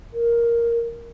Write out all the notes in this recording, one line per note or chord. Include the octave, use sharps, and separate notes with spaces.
A#4